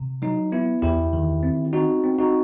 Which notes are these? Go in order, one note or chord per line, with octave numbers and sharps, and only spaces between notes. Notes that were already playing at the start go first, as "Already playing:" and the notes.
Already playing: C3
F#3 D#4
B3 E4
E2 E4 G4
D#3
C4
C4 D#4 F#4
C4
D#4 F#4